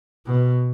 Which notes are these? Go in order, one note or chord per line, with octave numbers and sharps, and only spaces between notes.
B2